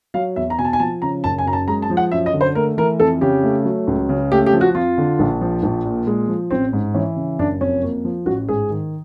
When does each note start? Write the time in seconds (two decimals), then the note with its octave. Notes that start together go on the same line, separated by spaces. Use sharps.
0.14 F#3 F5
0.36 E2 E5
0.50 A#5
0.58 B2 G#5
0.65 A5
0.73 G#5
0.80 F3 A5
1.02 C#3 A#5
1.24 F#1 A5
1.38 G#5
1.46 F#2 A#5
1.53 A5
1.68 G#3 A#5
1.82 A5
1.90 F3
1.97 F#5
2.12 F#2 E5
2.26 D#5
2.33 D3
2.41 C5
2.55 A3 A#4
2.78 E3 A#4
3.00 F2 A4
3.21 C#3 G4
3.43 A3
3.65 F#3
3.87 C#2
4.09 C#3
4.32 A3 G4
4.46 G4
4.53 F3
4.61 F#4
4.75 F2 F4
4.98 D3
5.19 A#1
5.41 F3
5.63 A#1
5.85 A#2
6.07 G#3
6.28 F3
6.51 A1 C4
6.73 G#2
6.94 E3 C#4
7.16 C#3
7.39 F#1 D4
7.61 F2 C#4
7.82 A#3
8.05 F3
8.26 A1 F#4
8.49 G#2 G#4
8.70 D#3